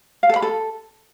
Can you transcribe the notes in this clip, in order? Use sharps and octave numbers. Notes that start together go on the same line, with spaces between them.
F5
A4
B5
A4